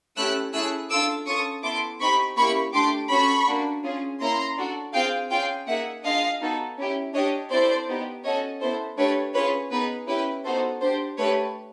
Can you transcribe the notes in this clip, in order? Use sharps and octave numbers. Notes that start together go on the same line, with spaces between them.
A3 C#4 E4 G4 E6 F#6
A3 C#4 E4 G#4 E6 F#6
D4 F4 A4 D6 E6
C#4 F4 A4 C#6 D#6
B3 E4 A4 C6 D6
C4 D#4 G4 B5 C#6
A#3 C#4 E4 G4 B5 C#6
A3 D4 G4 C6 D6
C#4 F#4 A4 B5 C#6
A#3 D4 F#4
C#4 F4 G#4
A#3 C#4 E4 A#5 C6
D4 F#4 A4
C4 F4 G#4 F5 G5
C#4 F4 G#4 F5 G5
A#3 D#4 G#4 E5 F#5
D4 F4 G#4 D#5 F5
B3 D#4 F#4 A4
C#4 E4 G4
D4 G4 C#5 D#5
C4 E4 A4 C5 D5
B3 D#4 G4
C#4 F#4 A4 C#5 D#5
B3 E4 A4 C5
A3 D4 G4 B4 C#5
C#4 F4 G#4 B4 C#5
B3 D#4 G#4 B4
C#4 E4 G4 B4
B3 D#4 F#4 A4 C5
D4 G4 C5
A3 D4 G4 B4 C#5